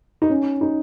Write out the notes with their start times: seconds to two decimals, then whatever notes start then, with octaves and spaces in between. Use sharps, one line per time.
0.22 D#4
0.30 C#4
0.61 D#4